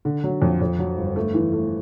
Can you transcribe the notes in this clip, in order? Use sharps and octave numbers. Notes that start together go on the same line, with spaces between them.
D3
F#3
F2
F2
F#3
G1
A3
E3
A3